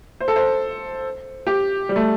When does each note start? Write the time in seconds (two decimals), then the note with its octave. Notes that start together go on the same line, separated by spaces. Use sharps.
0.20 C5
0.28 A4
0.36 C5
1.47 G4
1.89 G3
1.96 A3